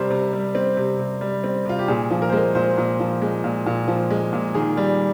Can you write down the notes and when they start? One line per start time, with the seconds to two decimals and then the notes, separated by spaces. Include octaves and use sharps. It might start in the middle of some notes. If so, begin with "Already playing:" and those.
Already playing: C3 G3 C4 A#4 C5
0.10 C3
0.33 G3
0.55 C4
0.77 C3
0.99 C3
1.21 G3
1.44 C4
1.66 C3 F4
1.79 G4
1.88 A#2 G#4
2.10 F3
2.22 A#4
2.30 C5
2.33 G#3 A#4
2.55 A#2 C5
2.77 A#2
3.00 F3
3.22 G#3
3.44 A#2
3.66 A#2
3.88 F3
4.10 G#3
4.33 A#2
4.54 D#3 G#4
4.77 G3